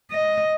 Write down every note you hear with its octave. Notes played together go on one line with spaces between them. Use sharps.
D#5